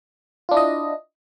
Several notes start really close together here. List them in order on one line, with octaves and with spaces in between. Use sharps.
F4 D4 E4 D#5